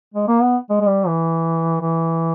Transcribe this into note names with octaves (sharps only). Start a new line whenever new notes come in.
G#3
A#3
B3
G#3
G#3
G3
E3
E3